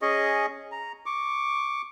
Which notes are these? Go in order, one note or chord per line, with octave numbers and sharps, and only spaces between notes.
C#4 G#4 D#5 C#6
A#5
C#6 D6